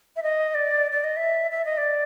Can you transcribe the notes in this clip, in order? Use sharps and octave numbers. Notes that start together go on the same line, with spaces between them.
E5
D#5
D5
D5
D#5
E5
E5
D#5
D5